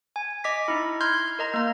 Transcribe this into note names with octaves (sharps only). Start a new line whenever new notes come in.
G#5
D#5 D6 B6
D#4 E4
C6 F6 G6 G#6
A#4 D#5 A#5
A#3 A#5